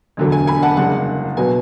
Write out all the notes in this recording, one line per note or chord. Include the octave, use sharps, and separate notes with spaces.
E1 D2 D3 F#3 A3
G#5
G#5 B5
F#5 A5
F#1 F#2 C#3 G#3 D4 F#5
B2 F#3 B3 G#5